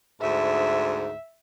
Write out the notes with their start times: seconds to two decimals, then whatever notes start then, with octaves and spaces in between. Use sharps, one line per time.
0.21 D2 G#2 E5